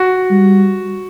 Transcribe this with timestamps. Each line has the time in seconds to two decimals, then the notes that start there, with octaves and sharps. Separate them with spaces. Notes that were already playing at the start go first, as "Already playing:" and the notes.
Already playing: F#4
0.31 G3